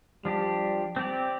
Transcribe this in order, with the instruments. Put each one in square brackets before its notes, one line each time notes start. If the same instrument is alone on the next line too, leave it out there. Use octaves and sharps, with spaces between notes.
[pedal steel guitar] F3 D4 G4 [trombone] G3
[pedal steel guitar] C4 G4 D5